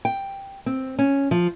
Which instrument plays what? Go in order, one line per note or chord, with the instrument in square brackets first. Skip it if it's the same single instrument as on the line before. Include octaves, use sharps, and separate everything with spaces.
[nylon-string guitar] G5
C4
C#4
F3